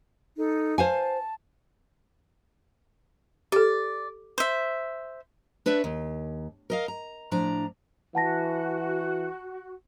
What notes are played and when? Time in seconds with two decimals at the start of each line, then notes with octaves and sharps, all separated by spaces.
0.36 D#4 A4
0.78 C5 F5 G#5 A5
3.52 G4 A4 D5
4.38 C5 E5
5.66 D4 B4 C#5 E5 A5
5.84 D#2
6.70 A#4 D#5 F5
6.88 A#5
7.31 A2 F3 D4 A#5
8.15 E3 F#4 F#5 A5 A#6